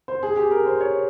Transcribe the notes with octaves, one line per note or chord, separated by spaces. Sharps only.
C5
G#4
G4
A#4
C5
C#5